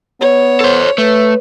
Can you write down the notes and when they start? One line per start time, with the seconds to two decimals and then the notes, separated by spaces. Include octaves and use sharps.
0.21 B3 C#5
0.61 A4 C5
0.98 A3 B4